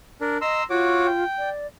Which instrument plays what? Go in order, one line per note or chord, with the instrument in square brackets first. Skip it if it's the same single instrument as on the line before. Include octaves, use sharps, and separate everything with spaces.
[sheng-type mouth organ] D4 A#4
[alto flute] D#5 [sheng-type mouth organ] A#5 C6 E6
[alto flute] F4 [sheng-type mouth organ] F#4 C#5 D6
[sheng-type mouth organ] G5
[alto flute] D5